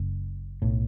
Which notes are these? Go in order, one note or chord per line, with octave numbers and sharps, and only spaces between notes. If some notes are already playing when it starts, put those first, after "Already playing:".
Already playing: F#1 F#2 C#3
B1 A2